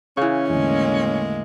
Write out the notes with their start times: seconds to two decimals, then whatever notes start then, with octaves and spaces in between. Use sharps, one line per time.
0.17 C#3 E3 C#4 F5 C#6
0.50 E2 A2 D3 G#3 A#3